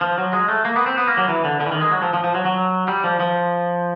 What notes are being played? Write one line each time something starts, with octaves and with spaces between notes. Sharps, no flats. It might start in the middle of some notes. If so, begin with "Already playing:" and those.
F3
F#3
G#3
A3
A#3
B3
C4
B3
A#3
F#3
E3
D3
D3
E3
D#3
G#3
F#3
F3
F3
F3
F#3
F#3
G3
F3
F3